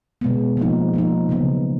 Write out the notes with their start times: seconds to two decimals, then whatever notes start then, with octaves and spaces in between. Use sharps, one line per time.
0.21 B2 G#3 B3
0.57 F3 A#3 D#4
0.94 F3 A#3 D#4
1.29 C#3 F#3 B3 D#4